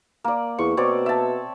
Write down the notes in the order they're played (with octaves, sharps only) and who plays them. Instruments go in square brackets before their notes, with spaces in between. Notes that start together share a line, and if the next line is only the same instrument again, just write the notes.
[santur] A#3 D5
[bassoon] E2 [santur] C#6
[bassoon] B2 [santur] C4 C#5 D5
[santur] E5 A5